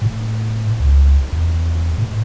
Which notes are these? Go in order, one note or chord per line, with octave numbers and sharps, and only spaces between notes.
A2
C#2
E2
A2